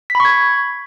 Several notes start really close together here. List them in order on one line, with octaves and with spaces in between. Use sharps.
B6 B5 C#6 G#6